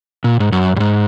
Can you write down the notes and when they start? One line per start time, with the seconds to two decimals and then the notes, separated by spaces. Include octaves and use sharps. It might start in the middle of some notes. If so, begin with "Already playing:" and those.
0.24 A#2
0.40 G#2
0.52 F#2
0.76 F#2
0.80 G#2